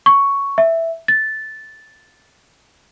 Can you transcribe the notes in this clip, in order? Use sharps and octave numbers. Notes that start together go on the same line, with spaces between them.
C#6
E5
A6